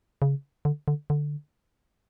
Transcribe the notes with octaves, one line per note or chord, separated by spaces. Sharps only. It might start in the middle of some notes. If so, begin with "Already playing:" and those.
C#3
D3
D3
D3